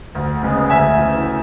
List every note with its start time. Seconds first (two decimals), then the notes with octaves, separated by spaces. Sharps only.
0.15 D2
0.43 C#3 G#3 B3
0.70 D2 E5 G#5
0.97 C#3 E3